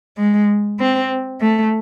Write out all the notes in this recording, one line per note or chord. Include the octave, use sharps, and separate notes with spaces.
G#3
C4
A3